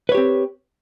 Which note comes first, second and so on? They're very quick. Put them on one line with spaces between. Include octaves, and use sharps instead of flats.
B4 C#5 G4 C4